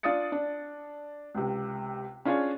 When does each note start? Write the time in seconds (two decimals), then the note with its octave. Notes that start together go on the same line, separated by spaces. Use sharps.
0.03 D4 F4 D5 D#6 A6 C#7
0.32 D4
1.35 C#2 C3
2.25 C#4 D4 F4 G#4 C#5